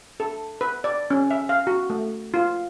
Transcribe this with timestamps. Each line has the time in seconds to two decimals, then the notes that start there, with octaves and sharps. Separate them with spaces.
0.20 A4
0.61 B4
0.84 D5
1.10 C#4
1.31 E5
1.49 F5
1.67 F#4
1.90 A3
2.34 F4